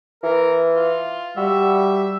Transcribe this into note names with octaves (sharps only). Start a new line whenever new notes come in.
E3 A#4
F4
G3 F#4 E5